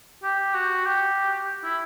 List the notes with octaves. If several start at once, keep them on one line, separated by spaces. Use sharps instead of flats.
G4
F#4
G4
E4